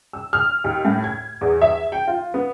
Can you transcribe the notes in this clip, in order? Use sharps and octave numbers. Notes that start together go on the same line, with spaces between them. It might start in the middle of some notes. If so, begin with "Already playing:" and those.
E6
F6
D#2
A2
G#6
E2
E5
G5
F4
B3